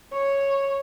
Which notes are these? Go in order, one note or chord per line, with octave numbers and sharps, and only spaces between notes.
C#5